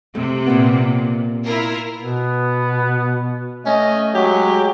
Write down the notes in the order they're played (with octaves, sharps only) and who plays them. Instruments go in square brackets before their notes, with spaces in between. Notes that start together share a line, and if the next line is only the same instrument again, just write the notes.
[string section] C3 [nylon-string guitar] A3
[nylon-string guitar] A#2 A#3 B3
[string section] E4 F4 A#4
[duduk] B2 [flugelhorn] B3
[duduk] A3 [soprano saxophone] C#4 [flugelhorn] D#5
[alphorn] F#3 [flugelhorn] G#3 [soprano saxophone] G4